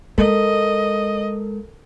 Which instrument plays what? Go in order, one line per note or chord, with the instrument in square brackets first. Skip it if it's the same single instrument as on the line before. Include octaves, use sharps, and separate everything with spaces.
[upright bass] G#3 [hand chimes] A4 A#4 [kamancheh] D#5